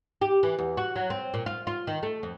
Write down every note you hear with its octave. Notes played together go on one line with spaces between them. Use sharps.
G4
E3
E2
F#4
F#3
C4
A#2
F4
F4
D#3
A3
F2